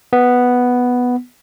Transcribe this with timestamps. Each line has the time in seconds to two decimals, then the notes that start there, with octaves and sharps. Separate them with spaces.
0.13 B3